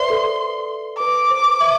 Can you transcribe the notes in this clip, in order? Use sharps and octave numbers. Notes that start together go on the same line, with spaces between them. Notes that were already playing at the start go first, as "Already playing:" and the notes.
Already playing: B4 C5 D5 E5 C6
A4
B4 D6
C5
E5